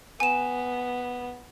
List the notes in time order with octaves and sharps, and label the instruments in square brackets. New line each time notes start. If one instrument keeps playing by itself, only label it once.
[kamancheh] B3 [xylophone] G#5 E7